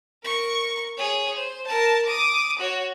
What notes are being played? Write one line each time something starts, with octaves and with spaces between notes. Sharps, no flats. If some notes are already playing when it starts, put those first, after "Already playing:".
A#4 C#6
G#4 C#5
C5
A#4 A5
D6 D#6
F#4 C#5